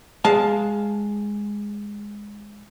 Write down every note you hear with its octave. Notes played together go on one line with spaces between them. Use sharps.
G#3 F5 A5